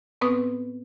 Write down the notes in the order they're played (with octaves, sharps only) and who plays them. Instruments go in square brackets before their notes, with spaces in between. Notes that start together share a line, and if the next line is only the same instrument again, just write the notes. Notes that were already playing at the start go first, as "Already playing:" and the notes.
[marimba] A2 B3 C4 B4 D#6